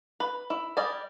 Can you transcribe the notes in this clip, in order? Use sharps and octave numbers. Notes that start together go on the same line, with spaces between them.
B4
E4
G3 D5 D#5 G#5